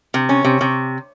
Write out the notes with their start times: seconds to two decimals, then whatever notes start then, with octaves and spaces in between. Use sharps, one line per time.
0.14 C3
0.29 C#4
0.45 C3
0.61 C3